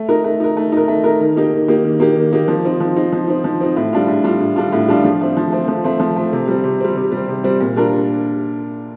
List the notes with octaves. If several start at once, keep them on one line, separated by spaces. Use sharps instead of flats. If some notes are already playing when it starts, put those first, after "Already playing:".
Already playing: A3
D#4 A#4
A3
D#4 A#4
A3
D#4 A#4
A3
D#4 A#4
D#3
A#3 D#4 G4
D#3
A#3 D#4 G4
D#3
A#3 D#4 G4
D#3
A#3 D#4 G4
F3
C4 D#4
F3
C4 D#4
F3
C4 D#4
F3
C4 D#4
A2
G3 D4 F4
A2
G3 D4 F4
A2
G3 D4 F4
A2
G3 D4 F4
F3
A3 C4
F3
A3 C4
F3
A3 C4
F3
A3 C4
C3
G3 C4
C3
G3 C4
C3
G3
C4
C3
G3 C4
A#2
G3 D4 F4 A#4